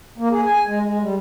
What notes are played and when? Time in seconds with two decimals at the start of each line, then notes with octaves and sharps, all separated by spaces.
0.18 A#3
0.31 G#4
0.45 G#5
0.67 G#3
0.83 G#3
1.00 G3